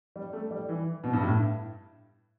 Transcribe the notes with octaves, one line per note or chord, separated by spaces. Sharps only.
G3
A3
G3
E3
B2
G2
A2